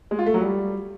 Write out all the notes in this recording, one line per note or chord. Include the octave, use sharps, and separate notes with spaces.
G#3
F4
A3
F#3
G3